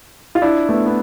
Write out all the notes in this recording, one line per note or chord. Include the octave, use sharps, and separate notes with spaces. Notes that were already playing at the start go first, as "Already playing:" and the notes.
F4
D4 E4
A3 B3
B3